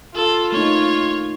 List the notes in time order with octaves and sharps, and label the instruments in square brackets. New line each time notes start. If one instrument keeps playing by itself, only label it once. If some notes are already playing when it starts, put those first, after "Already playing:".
[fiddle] F4 [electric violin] A4
[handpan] A3 A#3 D#4 [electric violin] C#5